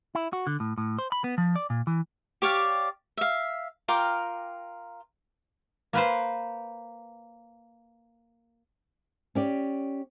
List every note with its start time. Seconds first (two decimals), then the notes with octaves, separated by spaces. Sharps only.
0.15 E4
0.33 F#4
0.47 D3
0.60 A2
0.78 A2
0.98 C5
1.12 B5
1.24 B3
1.38 F3
1.56 D5
1.70 A#2
1.87 E3
2.42 G4 C#5 D5 F5
3.17 E5 F5
3.88 F4 A#4 G5 D6
5.93 A#3 B4 C5
9.35 C#4 G4 D5